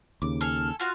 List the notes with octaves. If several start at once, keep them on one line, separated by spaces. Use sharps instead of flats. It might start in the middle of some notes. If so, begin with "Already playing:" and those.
D#2 C#3 D6
A4 G#5 F6
F4 F#4 F6 F#6